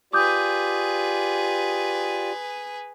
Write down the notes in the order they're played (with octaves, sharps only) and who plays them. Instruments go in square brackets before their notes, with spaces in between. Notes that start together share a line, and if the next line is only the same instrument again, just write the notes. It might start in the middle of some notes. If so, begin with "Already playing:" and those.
[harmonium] F4 G4 D5 [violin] G#4 B4 [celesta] D6 D#6 G6